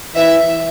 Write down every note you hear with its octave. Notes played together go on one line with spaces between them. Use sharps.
E3 E5